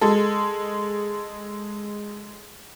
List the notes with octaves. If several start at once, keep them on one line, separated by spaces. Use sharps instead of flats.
G#3 A4